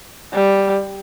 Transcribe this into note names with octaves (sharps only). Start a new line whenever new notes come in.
G3